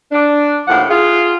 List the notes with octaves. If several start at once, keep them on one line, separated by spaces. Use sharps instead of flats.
D4
D#2 A2 F3 F#5
F4 G#4